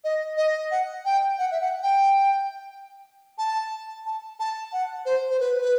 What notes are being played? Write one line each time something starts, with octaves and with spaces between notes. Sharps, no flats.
D#5
D#5
F#5
G5
F#5
E5
F#5
G5
A5
A5
A5
F#5
C5
C5
B4
B4